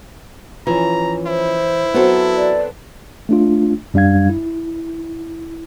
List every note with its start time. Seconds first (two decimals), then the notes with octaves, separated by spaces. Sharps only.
0.67 E3 F3 C#4 A#5
1.26 E4 C5
1.94 F#3 B3 C4 F#4 A4
2.36 D5
3.29 A3 D4 F4
3.94 F#2 G3 D4 F5 G#6
4.29 E4